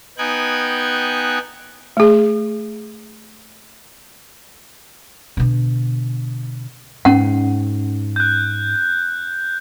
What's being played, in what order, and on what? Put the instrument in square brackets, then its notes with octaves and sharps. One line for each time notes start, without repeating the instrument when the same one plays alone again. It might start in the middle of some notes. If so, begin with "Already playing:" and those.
[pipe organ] B3 D#4 G5 G#5 F#6 G#6
[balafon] A3 G#4
[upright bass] B2 D3
[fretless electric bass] G#2 [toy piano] C#4 F#5
[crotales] F#6 G6